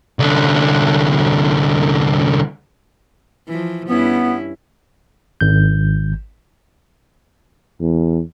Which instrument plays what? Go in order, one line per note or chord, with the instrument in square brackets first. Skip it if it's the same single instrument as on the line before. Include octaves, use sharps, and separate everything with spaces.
[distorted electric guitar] C2 D3
[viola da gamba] E3 F3
[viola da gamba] G2 C#4 E4 [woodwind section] B3
[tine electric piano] G#1 G6
[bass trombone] E2